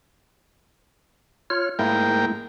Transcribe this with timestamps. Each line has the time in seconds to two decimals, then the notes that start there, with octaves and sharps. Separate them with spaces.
1.50 F4 C#5 F6
1.79 G#2 A3 A#3 E4 A#4 G5